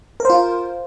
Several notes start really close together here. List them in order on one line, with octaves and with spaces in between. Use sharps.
A#4 C5 F4